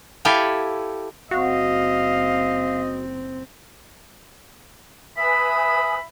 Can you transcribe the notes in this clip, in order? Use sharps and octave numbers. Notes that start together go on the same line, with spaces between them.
E4 G4 A4 F5 G5 G#5
F#1 C4 F#4 D#5 F5
B4 E5 G#5 B5 D#6